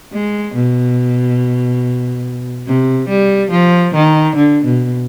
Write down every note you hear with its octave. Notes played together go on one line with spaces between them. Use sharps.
G#3
B2
C3
G3
F3
D#3
D3
B2